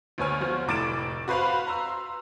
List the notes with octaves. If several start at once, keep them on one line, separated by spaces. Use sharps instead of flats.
D2 B3 C#5 G#5 F6
F3 F#4 C5
F1 A2 D6 A6 D7 E7
F#4 B4 C5 F5 B5
A#5 C6 E6